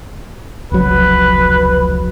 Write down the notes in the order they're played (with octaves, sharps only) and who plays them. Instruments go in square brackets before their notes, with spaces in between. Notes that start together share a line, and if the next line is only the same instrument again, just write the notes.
[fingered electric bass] F1 C#2 F#3 [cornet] B4